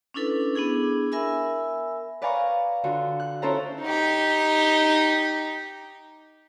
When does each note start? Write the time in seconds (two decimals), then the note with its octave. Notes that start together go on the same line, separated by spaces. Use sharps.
0.14 C#4 D4 E4 A4 B4
0.55 B3 D4 E4 G#4
1.12 A#4 E5 G#5 B5 E6
2.22 B4 D5 F5 G#5 A#5 C#6
2.84 D3 F4 F#4
3.20 F#6
3.42 C#4 E4 F4 A4 C5 A#5
3.82 D#4 G4